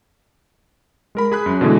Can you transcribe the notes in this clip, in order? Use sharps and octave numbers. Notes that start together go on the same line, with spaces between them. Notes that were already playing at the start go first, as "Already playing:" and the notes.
G#3 A#4 B5
G#4 B5 F#6
F#2
B2 D3 E3 G#3